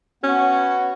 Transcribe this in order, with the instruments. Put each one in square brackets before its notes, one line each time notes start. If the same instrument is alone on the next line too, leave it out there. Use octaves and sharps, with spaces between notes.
[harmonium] B3 [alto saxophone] C#4 [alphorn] F#4